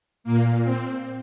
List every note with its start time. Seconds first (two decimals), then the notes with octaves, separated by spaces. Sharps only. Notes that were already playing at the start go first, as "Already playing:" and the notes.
0.24 A#2 A#3
0.64 C4